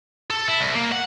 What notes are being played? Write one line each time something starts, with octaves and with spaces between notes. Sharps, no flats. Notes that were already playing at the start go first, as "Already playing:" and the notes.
A4
E4
C2
A#3
F#5